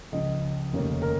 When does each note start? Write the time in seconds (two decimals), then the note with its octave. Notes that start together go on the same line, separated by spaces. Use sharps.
0.12 C#2 C#3 F3 D#5
0.73 F1 D#2 C#3 A#3 C#4
1.02 A#4